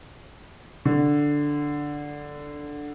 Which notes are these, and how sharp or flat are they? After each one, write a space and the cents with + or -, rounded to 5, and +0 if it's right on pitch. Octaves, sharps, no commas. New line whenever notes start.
D3 +0